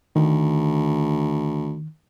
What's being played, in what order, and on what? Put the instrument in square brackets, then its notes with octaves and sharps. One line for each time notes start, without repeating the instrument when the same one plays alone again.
[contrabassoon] D2 [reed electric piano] D#3